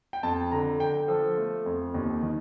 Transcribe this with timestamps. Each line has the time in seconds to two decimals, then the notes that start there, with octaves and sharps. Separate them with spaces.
0.13 G5
0.23 F2 A5
0.52 D3 A#5
0.79 D3 G5
1.08 F3 A4
1.38 A3
1.66 F2
1.94 D#2
2.23 D#3